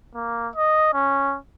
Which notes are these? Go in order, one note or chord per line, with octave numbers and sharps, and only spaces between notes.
A#3
D#5
C#4